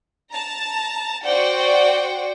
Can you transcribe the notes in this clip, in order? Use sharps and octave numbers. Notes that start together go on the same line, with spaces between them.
A5 A#5
F#4 C5 D5 F#5 G5